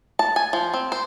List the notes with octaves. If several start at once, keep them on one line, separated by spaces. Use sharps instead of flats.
A5
G#5
F3
C4
C5